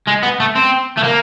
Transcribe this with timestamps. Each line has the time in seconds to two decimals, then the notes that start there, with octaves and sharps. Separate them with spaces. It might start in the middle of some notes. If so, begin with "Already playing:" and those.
0.08 G#3
0.23 B3
0.40 A3
0.55 C4
0.97 A3
1.03 A#3